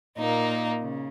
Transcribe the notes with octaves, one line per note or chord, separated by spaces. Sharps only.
A#2 A#3 D#4
C#3